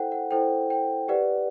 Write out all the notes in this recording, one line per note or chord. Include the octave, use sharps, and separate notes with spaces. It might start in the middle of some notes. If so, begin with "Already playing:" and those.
Already playing: E4 A4 C5 F#5 G5
F#5
E4 A4 C5 G5
G5
G4 B4 D5 F#5